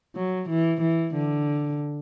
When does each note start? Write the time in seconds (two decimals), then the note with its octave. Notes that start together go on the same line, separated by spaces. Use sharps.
0.15 F#3
0.49 E3
0.81 E3
1.15 D3